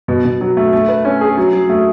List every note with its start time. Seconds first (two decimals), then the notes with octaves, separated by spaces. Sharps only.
0.08 B2
0.25 B2
0.41 F#3
0.57 A3
0.73 A3
0.88 B4
1.05 C#4
1.21 G#4
1.37 F#3
1.53 F#3
1.69 A3